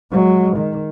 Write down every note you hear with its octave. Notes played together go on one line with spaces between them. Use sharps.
F#3 G#3
D#3